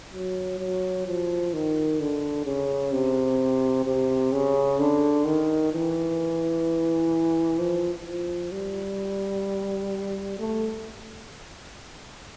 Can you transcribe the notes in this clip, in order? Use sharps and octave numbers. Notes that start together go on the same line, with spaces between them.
F#3
F#3
F3
D#3
D3
C#3
C3
C3
C#3
D3
D#3
E3
F3
F3
G3
A3